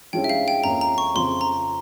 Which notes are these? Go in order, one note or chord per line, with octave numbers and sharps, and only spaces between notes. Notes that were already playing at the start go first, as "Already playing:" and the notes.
G2 F3 G#3 C#4 E4 G5
E5
F5
G5
F2 E3 A#3 C#4 E4 A#5
A#5
C#6
F2 C#3 F3 C4 C6
A#5